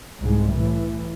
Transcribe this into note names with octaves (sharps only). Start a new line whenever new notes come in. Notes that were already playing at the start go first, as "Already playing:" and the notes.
C2 G#2 G#3
A2 E3